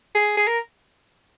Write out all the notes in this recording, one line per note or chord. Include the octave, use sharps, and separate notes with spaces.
G#4
G#4
A#4